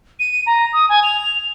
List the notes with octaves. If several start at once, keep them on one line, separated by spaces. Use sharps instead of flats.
D#7
A#5
D#6
G#5
F7